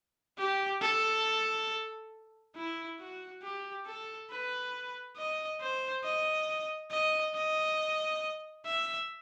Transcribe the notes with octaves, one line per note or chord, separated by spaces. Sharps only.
G4
A4
E4
F#4
G4
A4
B4
D#5
C5
D#5
D#5
D#5
E5